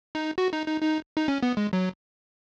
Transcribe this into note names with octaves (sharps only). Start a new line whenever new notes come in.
D#4
F#4
D#4
D#4
D#4
D#4
C#4
B3
G#3
F#3